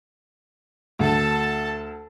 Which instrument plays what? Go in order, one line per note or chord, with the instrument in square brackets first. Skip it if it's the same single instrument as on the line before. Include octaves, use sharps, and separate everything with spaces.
[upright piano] D2 [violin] A4 A5